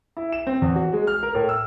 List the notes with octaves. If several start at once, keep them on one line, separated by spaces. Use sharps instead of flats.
E4
E7
C4
E2
F#4
G#3
F6
A#4
A2
E6